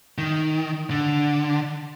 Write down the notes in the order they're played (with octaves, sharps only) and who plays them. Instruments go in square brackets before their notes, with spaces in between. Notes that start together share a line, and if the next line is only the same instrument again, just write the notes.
[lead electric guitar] D#3
D3